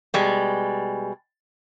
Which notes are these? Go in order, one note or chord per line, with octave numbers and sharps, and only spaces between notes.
B2 G3 G#3